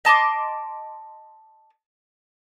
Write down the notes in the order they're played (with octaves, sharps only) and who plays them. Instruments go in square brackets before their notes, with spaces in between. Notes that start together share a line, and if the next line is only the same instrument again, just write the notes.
[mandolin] D#5 A5 C6 D6